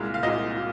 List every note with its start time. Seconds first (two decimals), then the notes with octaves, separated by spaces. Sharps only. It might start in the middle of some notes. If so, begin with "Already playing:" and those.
Already playing: C2 A#2 G#3 F5
0.14 F5
0.23 C2 A#2 G#3 D#5
0.57 A#2